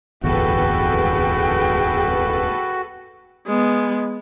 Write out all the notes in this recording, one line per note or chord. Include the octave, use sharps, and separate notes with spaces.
D1 G1 E2 F#4 G#4 A4 B4 G5
G#3 B3